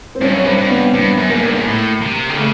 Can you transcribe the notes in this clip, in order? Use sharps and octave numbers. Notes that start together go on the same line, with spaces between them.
C4
G2 C#4
F#2
G2 C4
G2
B3
G2 B3
F#2
G#2 A#3
G2
G#2
A2
C3
D3
C#3 A3